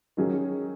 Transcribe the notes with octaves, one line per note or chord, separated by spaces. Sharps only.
D#3 F#3 C#4 G#4